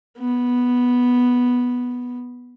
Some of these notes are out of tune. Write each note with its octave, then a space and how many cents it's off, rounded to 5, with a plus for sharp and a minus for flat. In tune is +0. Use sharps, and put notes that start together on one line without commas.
B3 -5